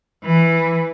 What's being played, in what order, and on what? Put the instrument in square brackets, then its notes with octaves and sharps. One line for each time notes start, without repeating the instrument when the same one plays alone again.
[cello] E3